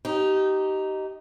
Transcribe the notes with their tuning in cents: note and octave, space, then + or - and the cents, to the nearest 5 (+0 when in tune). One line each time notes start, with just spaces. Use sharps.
D#4 +0 G4 -25